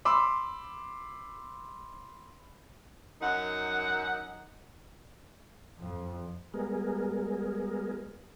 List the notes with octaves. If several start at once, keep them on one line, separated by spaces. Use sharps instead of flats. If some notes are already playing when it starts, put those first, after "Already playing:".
B5 C6 D6 E6
F#2 D#4 F#5
F2
G3 G#3 B3 G#4 A#4